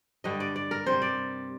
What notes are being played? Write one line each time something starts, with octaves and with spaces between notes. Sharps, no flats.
G2 D3 G3 D#5
D5
D5
A#4
C3 G3 C5
D5